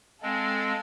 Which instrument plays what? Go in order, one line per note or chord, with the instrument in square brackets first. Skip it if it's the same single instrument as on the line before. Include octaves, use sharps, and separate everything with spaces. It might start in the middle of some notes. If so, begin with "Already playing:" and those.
[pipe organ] G#3 C4 [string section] A4 F5 G#5